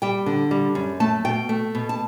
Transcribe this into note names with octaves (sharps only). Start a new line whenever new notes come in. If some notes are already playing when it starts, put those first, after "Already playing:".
G3 G5
D3
G3
F#2
A3 A5
B2 G5
A3
B2
A5